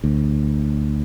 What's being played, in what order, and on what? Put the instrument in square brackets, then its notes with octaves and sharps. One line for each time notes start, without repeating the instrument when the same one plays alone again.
[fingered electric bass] D2